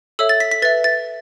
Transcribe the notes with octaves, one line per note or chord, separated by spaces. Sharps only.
A4 C#5 E5 E6
A6
B6
B6
B4 E5 A6
A6